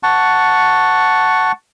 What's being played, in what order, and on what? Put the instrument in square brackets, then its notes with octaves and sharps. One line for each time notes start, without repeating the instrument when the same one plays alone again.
[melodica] F#5 A5 C#6